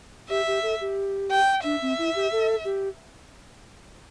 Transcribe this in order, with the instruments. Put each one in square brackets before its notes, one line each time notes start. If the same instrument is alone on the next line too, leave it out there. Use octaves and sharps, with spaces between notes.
[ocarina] G4 [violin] E5
[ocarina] G4
A4
G4
[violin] G5
[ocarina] D4 [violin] E5
[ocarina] C4
E4
G4
A4
G4